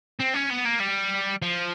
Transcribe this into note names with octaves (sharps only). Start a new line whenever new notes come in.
C4
C#4
B3
A#3
G3
F3